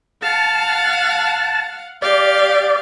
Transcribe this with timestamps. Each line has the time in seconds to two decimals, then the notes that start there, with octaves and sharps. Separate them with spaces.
0.22 F5 F#5 A5
2.02 G4 D5 F5